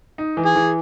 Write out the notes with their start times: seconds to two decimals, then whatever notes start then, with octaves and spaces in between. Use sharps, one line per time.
0.18 D#4
0.37 E3
0.45 G#4
0.55 E3